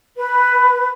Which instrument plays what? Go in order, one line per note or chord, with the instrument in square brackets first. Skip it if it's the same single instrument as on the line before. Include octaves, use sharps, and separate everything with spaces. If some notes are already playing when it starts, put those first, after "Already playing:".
[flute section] B4